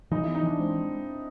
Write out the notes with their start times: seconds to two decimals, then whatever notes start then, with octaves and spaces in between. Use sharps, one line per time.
0.11 E3 D#4
0.24 B3 E4
0.35 D#4
0.43 E3 D4
0.59 G#3 C4